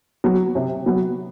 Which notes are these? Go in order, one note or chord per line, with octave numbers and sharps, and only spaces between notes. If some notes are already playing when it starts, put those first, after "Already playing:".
F#3 B3
C3
F#3 B3